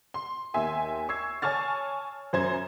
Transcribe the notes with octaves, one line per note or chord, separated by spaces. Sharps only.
C6
D#2 E5 G#5 C6
C#6 E6 G#6 C7
C#5 G#5 A5 C#6 F6 A6
F#2 C5 G#6